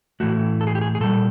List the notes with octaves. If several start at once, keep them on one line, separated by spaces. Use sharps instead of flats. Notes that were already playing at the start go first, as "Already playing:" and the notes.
A2 E3 A3 F#4
A4
G#4
G4
G#4
G#4
A#2 G3 A4